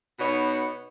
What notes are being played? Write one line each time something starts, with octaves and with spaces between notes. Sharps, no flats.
B2 B3 D#4 C#5